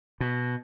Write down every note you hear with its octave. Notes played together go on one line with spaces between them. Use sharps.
B2